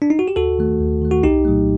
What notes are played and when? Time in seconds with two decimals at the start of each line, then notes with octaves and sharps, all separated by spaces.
0.02 D4
0.10 D#4
0.19 F#4
0.28 G4
0.36 D#2 F#4 A4
0.59 D#3 A3
0.81 D#2
1.01 D#3 A3
1.11 F#4
1.23 C2 D#4 G4
1.45 A#2 F#3 A3